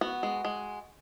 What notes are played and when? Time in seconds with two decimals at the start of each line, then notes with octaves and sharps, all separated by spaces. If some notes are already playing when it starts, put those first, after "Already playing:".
0.01 B3 F#4
0.23 G#3
0.45 G#3